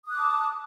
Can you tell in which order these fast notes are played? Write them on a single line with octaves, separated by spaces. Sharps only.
D#6 F#6 D6 A5